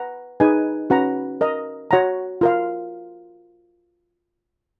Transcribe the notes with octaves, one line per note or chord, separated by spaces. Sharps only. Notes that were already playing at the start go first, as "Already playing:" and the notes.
Already playing: B4 F#5 A#5
D#4 G#4 B4 D#5 G#5
C#4 F#4 B4 F#5 A#5
A#4 D#5 A#5
F#4 C#5 F#5 A#5
F4 A#4 F5